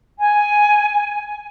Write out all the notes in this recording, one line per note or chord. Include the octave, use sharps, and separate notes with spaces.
G#5